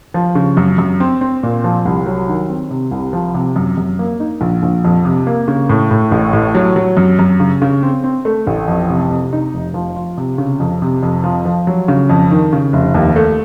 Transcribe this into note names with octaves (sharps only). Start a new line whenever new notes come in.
F3
C#3
F#2
F#2
C4
C4
A#2
F3
C2
F#3
D#3
C4
C3
C2
F3
C3
F#2
F#2
A#3
D#4
A#1
A#1
F2
C3
A#3
C#3
A2
A2
A1
A2
F#3
F#3
F#2
F#2
C#3
C#3
C4
C4
A3
A1
F2
C3
C3
D#4
F1
F3
F4
C3
C#3
F2
C3
F2
F3
F3
F#3
C#3
F2
D#3
C#3
F1
D#2
A3